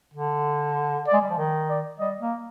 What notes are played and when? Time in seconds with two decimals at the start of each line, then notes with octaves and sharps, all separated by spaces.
0.14 D3
1.07 D5
1.13 G#3
1.21 G3
1.30 F3
1.38 D#3
1.69 D5
1.99 G3 D#5
2.20 A#3